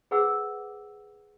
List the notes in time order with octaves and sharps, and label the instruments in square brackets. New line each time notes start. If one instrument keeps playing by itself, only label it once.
[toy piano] G#4 B4 C5 F#5 D6 E6